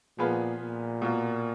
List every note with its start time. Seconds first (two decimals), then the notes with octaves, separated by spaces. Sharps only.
0.18 A#2 F3 B3 F4 G#4 B4
0.61 A#2
1.02 B2 A#3 F4